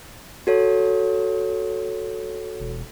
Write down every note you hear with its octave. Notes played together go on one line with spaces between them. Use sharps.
F#4 A4 C#5
E1